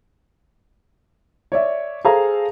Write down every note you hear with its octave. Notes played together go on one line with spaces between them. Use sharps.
C#5 D5 E5
G#4 A4 C5 F5 A#5